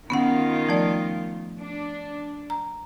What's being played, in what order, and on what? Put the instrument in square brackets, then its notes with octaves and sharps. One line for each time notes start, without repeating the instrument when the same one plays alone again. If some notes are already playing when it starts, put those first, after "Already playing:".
[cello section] D#3 F4 [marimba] B3 C#4 F#5
[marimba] F3 A3 D5
[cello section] D4
[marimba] A#5